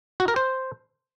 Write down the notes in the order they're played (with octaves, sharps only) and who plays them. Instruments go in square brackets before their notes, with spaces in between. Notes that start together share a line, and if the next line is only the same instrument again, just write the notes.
[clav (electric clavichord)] F#4
A#4
C5